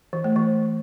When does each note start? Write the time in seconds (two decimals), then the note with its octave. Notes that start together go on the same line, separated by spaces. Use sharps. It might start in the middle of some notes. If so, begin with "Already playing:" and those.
0.13 E3
0.24 A3
0.36 E3